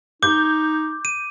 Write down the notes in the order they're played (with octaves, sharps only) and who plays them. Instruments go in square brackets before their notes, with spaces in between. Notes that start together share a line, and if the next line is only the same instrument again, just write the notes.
[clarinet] D#4 [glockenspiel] D6 [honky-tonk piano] G6
[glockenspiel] D#7